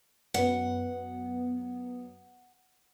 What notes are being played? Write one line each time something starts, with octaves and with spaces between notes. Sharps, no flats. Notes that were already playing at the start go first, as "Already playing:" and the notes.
F#2 F#3 B3 F#5